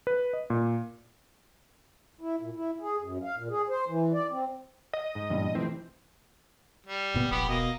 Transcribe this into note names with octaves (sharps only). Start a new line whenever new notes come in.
B4
D#5
A#2
E4
A#2
E4
G#4
F#2
F5
A#2
G#4
C5
E3
D5
C4
D#5
G#2
E2 G2 A#2 E3
C3 E3 F3 A3 C4
G3
F#1 A#2 B3
E1 A#1 B3 G4 B5
B2 A#3 D#5